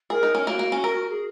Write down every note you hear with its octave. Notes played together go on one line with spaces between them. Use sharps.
G#4 A#4
D#4
C#4
A#3 F#4
A#3
C#4
A#4
G#4